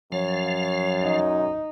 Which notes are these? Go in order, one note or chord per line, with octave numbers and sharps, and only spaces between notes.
F#2 F3 C#5 F5
D#4